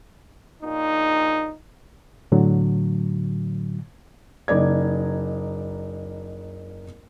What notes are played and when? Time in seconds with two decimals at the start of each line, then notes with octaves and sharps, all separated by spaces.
0.63 A#1 A#2 D#4
2.32 A2 D3 F#3
4.48 F#1 D#4 D5 G#6